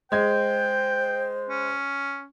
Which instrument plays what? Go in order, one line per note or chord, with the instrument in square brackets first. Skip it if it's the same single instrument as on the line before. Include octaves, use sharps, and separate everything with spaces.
[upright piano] G#3 G#6 [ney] C5 [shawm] G5
[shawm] C#4